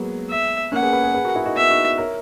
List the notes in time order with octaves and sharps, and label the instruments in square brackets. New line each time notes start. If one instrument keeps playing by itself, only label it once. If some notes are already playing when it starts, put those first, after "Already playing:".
Already playing: [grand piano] F#3 G#3 A#3 B3
[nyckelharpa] E5
[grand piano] A#3 C#4 [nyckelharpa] F#5
[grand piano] G#4 B4
G#4 B4
G#4 B4
G#4 B4
F#4 A#4
E4 G#4
D#4 F#4
[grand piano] B3 D#4 [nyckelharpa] E5
[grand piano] D#4 F#4
A#4 C#5